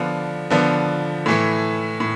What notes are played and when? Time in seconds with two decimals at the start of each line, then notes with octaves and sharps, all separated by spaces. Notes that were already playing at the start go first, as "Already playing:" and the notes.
Already playing: D3 F3 B3 D4
0.50 D3 F3 B3 D4
1.26 A2 E3 A3
2.00 A2